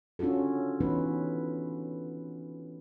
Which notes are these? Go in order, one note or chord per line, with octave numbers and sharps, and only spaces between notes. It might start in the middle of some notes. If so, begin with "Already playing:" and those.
C#4 D4 F4 F#4 A4
E3 A3 B3 C#4 D#4 B4